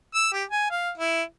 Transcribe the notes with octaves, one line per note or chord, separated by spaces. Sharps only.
E6
G4
G#5
F5
E4